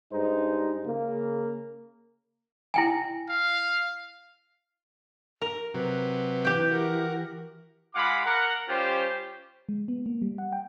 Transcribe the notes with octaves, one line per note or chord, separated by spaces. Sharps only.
G2 G#3 D#4 C5
C#3 A#3
E4 G5 G#5
F5
A#4
C3 F#3 B4
E3 G4 G5
F#4 A#4
G#3 F4 F5 F#5 B5 D6
A#4 F#5
G3 C#4 F4 G4 C5
G#3
B3
A#3
G3
F#5
G5